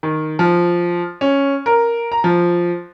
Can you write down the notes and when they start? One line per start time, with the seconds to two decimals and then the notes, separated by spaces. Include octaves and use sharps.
0.03 D#3
0.39 F3
1.21 C#4
1.66 A#4
2.12 A#5
2.24 F3